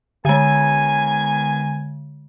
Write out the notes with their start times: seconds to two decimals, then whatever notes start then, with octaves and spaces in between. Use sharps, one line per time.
0.25 D3 D#3 G#3 B3 G#5